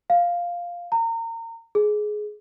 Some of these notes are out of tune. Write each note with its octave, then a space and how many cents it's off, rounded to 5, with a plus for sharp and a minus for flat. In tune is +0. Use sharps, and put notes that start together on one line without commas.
F5 +0
A#5 -30
G#4 +20